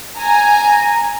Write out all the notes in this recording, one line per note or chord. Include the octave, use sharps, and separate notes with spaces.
G#5 A#5